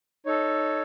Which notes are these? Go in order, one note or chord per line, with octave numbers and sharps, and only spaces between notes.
D#4 A4 C#5